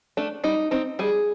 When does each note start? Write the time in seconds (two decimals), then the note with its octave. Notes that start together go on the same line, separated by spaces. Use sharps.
0.17 A3 D4
0.44 G3 D#4
0.71 C4 D#4
0.99 G3 G#4